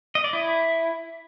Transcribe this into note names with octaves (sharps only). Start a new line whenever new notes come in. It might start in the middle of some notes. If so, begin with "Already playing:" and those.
D#5
D5
E4